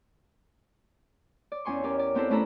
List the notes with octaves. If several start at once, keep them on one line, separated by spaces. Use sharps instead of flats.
D5
E2 C#4 G#5 C6 C#6
C#4 G4 A#4 D5
D5
E3 B3 C4 E4 A4 C5
A3 C#4 E4 A4 A#5 B5